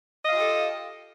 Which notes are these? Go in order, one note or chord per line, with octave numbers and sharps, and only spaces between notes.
F4 G4 A4 D#5 F5